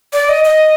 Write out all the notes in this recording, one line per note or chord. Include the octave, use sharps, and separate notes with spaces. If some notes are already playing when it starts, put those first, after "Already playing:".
D5
D#5
D#5